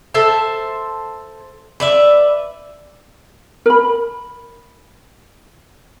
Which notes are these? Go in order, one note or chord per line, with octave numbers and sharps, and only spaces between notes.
A4 C5 E5 A5
B4 D5 E5
A#4 B5